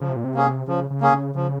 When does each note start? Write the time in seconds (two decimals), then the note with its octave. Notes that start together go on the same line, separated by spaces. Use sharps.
0.01 C#3 F3
0.09 C3
0.16 A#2
0.24 C3
0.34 A#3 C#4 G#4
0.68 C#3 F3
0.90 C#3
1.01 A#3 C#4 G#4
1.13 C#3
1.35 C#3 F3